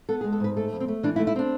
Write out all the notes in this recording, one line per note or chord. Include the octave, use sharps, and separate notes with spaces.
B3 A4
G#4
G#3
A4
G#2 B4
A3 A4
F2
C4
A3
E3 D4
E4
A3
E4
C4 D4